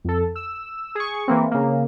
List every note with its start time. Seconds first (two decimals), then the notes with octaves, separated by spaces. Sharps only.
0.04 F2 A4
0.35 E6
0.95 G#4 C#6
1.28 E3 A#3 C4
1.51 C#3 A#3